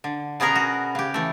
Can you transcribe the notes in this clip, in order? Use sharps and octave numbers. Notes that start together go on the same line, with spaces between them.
D3
B2 B3 C#4 G#4 A#4 A#5
F#4
C#3 G4
E3 A3